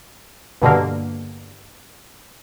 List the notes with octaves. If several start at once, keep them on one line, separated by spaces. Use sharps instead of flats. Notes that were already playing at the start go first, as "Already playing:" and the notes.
G2 B2 D3 A#3